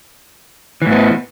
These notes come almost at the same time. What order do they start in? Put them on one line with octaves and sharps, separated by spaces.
E3 A2 B3